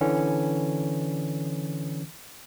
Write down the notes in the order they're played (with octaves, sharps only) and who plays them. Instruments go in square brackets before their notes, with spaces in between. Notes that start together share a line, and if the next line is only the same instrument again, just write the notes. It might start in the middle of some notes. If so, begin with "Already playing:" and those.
[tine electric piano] D3 E3 C#4